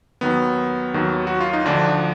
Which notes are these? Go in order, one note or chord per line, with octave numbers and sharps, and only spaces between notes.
D#2 D#3 F#3 B3
D#2 D#3 F#3
F#4
F4
D#4
D2 D3 F3 D4